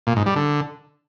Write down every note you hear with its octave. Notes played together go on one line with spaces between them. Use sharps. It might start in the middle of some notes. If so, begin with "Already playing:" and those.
A#2
G#2
G3
D3